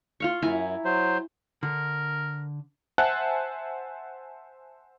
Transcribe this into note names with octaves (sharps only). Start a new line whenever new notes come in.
F4 F5 C#6
F#2 E4 G#5 A#5
F#3 C5
D3 A#4
C5 E5 F#5 G#5 A5 F#6